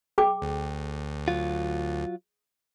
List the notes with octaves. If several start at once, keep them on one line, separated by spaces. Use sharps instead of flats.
G#4 G5 D6
D2
F#3 F4